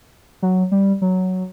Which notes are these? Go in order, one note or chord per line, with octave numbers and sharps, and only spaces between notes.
F#3
G3
F#3